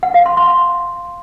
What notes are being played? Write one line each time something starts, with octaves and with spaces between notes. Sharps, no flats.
F#5
F5
C6
C6